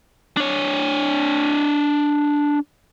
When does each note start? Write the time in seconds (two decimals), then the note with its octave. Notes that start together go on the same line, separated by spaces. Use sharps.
0.37 D4 C#5